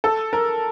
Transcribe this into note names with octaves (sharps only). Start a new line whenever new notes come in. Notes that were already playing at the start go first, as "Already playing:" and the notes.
A4
A#4